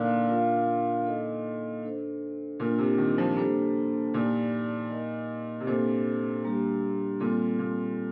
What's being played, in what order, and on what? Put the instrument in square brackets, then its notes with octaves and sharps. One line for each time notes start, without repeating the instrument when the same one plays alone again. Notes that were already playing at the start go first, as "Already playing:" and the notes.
Already playing: [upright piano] A#2 D3 [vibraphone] A#3 D#4 A#4 D5 F5
[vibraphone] D4 F4 A#4 F5
D#4 A4 D#5
D4 A4 C5
[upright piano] A#2 [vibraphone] D4 F4 A#4
[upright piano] C3
D#3
F3
[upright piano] G3 [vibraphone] A#3 D4 A4 C5
[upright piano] A#2 [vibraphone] D#4 G4 D5
[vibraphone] D#4 A#4 D#5
[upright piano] C3
[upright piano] A#2 [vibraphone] D4 A4 C5
[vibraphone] G3 A#3 D4 G4
[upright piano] A#2 [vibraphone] G3 C4 F4 A4
[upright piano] A#2